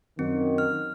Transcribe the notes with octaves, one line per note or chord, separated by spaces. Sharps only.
F#2 D#3 C4
F6